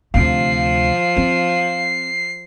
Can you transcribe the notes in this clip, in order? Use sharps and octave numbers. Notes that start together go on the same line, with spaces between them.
D2 C3 F3 F5 C7
C4